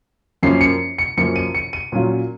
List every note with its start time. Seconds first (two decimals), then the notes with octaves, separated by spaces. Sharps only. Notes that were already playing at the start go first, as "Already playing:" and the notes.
0.43 F#2 F3 A#3 C#4 C7
0.61 C#7
0.98 C#7
1.17 F#2 F3 A#3 C#4 C#7
1.36 D#7
1.55 C#7
1.73 D#7
1.92 A#2 F#3 C#4 F4